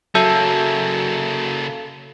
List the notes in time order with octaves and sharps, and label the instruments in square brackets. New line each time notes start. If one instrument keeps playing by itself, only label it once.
[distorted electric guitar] C#3 A#3 [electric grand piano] F#3 E5 G6 [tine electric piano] A4